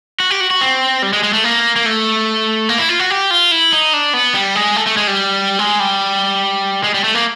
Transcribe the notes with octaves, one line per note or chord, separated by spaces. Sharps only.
F#4
G4
F#4
F#4
C4
G3
G#3
G#3
A3
A#3
A#3
A3
A#3
E4
F4
F#4
G4
F4
E4
D#4
D4
B3
G3
G#3
A3
A3
G#3
G3
G#3
G3
G#3
G3
A3
A#3